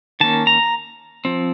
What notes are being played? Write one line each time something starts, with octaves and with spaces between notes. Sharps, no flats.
D#3 A#3 C#4 A5
A#5
F3 C4